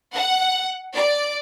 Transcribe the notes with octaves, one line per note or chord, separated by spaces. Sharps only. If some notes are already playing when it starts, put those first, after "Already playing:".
F#5
D5